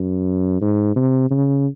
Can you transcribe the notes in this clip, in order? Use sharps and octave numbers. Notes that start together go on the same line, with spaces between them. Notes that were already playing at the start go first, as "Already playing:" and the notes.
Already playing: F#2
G#2
C3
C#3